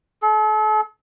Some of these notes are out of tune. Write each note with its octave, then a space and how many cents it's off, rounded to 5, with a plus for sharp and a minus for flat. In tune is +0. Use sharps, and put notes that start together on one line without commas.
A4 -40